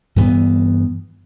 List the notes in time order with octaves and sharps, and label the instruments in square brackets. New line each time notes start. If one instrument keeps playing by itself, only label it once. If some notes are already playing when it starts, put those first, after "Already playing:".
[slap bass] G2 E3 B3